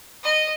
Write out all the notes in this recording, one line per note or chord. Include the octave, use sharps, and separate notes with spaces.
D#5